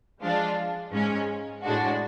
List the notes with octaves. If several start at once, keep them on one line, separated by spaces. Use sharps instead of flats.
F3 G#3 D4 F4
G#2 G#3 C#4
A2 G#3 D4 F#4